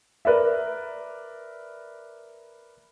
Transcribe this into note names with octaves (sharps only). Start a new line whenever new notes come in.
A#4 B4 D5 E5